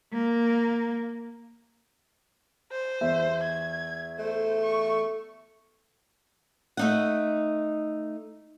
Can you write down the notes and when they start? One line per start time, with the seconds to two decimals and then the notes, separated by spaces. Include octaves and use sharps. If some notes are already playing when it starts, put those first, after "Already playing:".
0.12 A#3
2.72 C5
3.01 E2 E5
3.44 G#6
4.19 A3 C5
4.61 C#6
6.77 A3 D#4 F#5